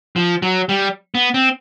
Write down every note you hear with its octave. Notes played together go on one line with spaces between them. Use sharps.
F3
F#3
G3
B3
C4